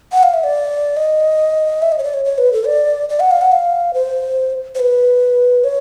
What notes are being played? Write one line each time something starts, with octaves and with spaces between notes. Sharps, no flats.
F#5
F5
E5
D5
D#5
E5
D#5
C#5
D5
C#5
C#5
B4
A4
D5
D5
F#5
F5
F#5
F5
C5
C5
B4
C#5